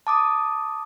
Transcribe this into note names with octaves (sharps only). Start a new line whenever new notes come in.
A5 D6 D#6